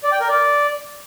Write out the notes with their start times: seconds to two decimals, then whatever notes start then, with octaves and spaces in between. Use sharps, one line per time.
0.03 D5
0.12 G5
0.20 A#4
0.29 D5